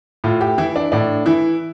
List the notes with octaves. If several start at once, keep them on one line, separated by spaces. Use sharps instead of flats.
A2 F4
G4
E3 E4
D4
A2 D4
E3 E4